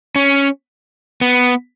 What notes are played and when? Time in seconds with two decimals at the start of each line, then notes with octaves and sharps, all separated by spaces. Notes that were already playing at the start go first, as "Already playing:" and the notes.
0.16 C#4
1.21 B3